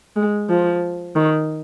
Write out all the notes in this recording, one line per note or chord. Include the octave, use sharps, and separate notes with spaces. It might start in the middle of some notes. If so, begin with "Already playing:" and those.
G#3
F3
D#3